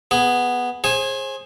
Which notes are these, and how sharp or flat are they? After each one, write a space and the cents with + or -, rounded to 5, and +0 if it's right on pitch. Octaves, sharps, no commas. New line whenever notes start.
B3 +0 G#4 +0
G#4 +0 C5 +35 G#5 -5